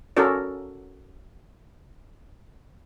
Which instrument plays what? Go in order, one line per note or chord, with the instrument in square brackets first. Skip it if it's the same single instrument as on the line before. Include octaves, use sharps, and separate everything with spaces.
[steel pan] C#4 F#4 A4 A#4 D5